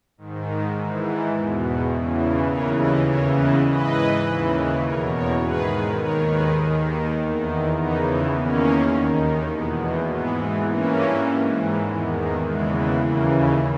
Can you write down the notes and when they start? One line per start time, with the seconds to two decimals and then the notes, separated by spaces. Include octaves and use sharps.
0.18 G#2 D#3
0.76 G#2 E3
1.35 E2 B2
1.94 E2 C#3 E3
2.51 D#2 C#3 E3 A#4 C#5
2.80 B4 D#5
3.10 E2 C#3 E3 A#4 C#5
3.39 B4 D#5
3.68 G#2 E3 B4 D#5
4.27 D#2 C#3 E3
4.85 E2 B2 A#4 C#5
5.15 A#4 C#5
5.44 G#2 D#3 G#4 B4
6.02 D#2 D#3 A#4 C#5
6.31 G#4 B4
6.62 D#2 D#3
7.20 E2 D#3
7.78 E2 C#3 E3 B3 D#4
8.36 E2 D#3 A#3 C#4
8.94 D#2 D#3
9.53 E2 B2 G#3 B3
9.82 A#3
10.11 G#2 E3 G#3 B3
10.70 G2 E3 A#3 C#4
11.29 G#2 E3
11.87 E2 D#3 G#3 B3
12.16 A#3
12.46 E2 C#3 E3 G#3
13.04 D#2 C#3 E3 A#3